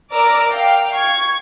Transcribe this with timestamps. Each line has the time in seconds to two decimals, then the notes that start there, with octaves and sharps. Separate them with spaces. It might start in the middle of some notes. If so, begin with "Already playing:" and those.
0.14 A#4 D5 D6 E6 A#6
0.48 F5 G5
0.95 C#6 G#6